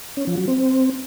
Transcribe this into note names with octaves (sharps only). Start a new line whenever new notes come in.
C#4
F3
F#3
C4